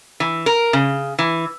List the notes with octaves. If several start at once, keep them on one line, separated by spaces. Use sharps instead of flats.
E3
A#4
C#3
E3